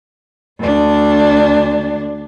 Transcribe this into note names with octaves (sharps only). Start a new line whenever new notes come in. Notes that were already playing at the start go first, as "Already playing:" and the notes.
D2 D4